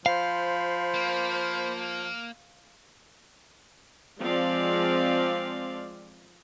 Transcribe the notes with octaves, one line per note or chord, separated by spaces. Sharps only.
F3 C5 F5 B5
A#3
F3 G#3 C4 D5 F5